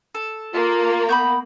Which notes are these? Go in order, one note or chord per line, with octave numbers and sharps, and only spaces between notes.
A4
A#3 F4
B3 B5 C#6 G6